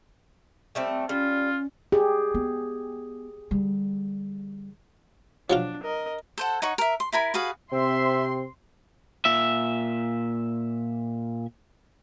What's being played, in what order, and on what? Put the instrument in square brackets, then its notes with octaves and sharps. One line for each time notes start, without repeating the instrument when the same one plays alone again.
[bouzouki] G3 A3 C4
[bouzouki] G3 [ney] C#4 [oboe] F4
[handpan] G4 G#4
[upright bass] B3
D3 G3
[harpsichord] F3 F#3 F4 [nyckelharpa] D4
[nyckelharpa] A#4 D#5
[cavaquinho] A4 C5 F#5
D#4 C#5 F#5 C#6
A#4 E5
C6
E4 A#4 G#5 B5
F#4 G#4 B4 F5
[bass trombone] C3 [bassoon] C4 [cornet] E5 [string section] C6
[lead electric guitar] A#2 E5